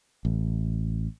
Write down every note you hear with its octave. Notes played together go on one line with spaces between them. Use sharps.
A1